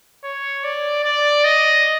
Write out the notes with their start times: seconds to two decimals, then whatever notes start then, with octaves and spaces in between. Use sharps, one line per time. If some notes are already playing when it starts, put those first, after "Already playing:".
0.24 C#5
0.64 D5
1.04 D5
1.45 D#5